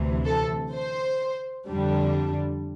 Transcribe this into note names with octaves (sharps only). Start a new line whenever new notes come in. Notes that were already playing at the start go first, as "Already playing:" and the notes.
Already playing: D2 C3 E3
A4
C5
F2 D3 G3 D4